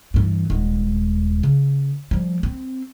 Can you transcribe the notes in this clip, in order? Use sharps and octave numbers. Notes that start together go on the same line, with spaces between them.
G2 E3
D#1 G#3
C#3
F3 G3
C4